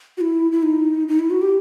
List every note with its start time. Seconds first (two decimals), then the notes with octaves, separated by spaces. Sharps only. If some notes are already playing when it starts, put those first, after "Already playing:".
0.17 F#4
0.21 E4
0.52 E4
0.63 D#4
1.08 D#4
1.19 E4
1.30 F#4
1.42 G4